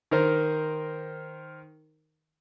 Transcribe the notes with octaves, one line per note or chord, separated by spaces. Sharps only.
D#3 A#4 C5